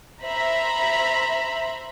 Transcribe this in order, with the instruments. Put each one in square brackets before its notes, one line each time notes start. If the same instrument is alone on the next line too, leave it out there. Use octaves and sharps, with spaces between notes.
[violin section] C5 E5 A#5 B5